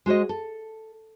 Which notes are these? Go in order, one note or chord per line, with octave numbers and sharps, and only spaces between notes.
G#3 F#4 C5 D#5
A4